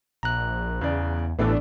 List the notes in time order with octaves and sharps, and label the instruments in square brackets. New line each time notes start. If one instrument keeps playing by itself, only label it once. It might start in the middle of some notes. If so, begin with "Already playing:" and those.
[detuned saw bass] A#1 [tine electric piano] A#5 F#6
[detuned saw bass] E2 [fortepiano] C#3 D5
[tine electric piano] A1 A2 E3 [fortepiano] A3 B3 [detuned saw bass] D4